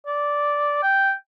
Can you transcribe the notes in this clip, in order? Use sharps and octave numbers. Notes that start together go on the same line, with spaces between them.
D5
G5